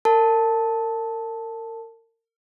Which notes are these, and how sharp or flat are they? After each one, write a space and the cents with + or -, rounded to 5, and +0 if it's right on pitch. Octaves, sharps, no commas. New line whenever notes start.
A#4 -35 A5 +0